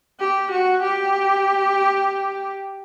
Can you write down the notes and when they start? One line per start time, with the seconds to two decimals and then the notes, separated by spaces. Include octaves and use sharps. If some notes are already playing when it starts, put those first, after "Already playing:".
0.20 G4
0.51 F#4
0.82 G4